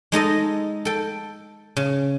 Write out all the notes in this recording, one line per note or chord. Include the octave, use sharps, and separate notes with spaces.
G#3 D#4 A4 D#5
A4 G5
C#3